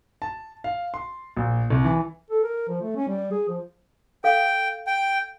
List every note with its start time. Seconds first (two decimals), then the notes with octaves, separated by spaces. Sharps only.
0.22 A5
0.64 F5
0.94 C6
1.37 A#1
1.70 C2
1.84 E3
2.30 A4
2.44 A#4
2.68 F3
2.82 A3
2.96 C#4
3.08 G3
3.32 G#4
3.48 F3
4.24 A4 F5 G5
4.87 G5